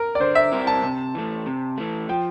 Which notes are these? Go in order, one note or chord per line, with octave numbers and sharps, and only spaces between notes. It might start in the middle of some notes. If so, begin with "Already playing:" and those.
Already playing: A#4
D5
D3 C5
E5
G3 C4 E4 A#4
A5
C3
E3 A3
C3
E3 A3
F3 G5